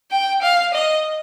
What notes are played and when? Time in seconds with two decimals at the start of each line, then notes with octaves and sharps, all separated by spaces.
0.11 G5
0.42 F5
0.74 D#5